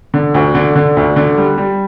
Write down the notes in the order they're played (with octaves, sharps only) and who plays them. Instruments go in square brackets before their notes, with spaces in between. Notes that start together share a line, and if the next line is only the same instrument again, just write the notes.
[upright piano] D3
D2
D3
D3
D2
D3
G3
G3